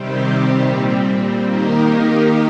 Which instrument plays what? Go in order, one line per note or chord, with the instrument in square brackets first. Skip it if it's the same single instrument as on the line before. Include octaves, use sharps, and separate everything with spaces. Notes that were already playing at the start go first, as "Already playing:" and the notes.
Already playing: [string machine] C3 D#3 G3 C4 G4
A#2 G3 C4
D#3 A#3 D#4 G4 A#4